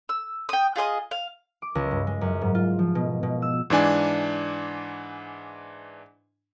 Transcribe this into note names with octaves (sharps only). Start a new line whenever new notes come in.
E6
G5 D#6
F4 G#4 D#5 D#6
F5
D6
C#2
G2
G#3
F#2
G#2
F4
F3
B2
B2
E6
G#2 E3 D4 G#5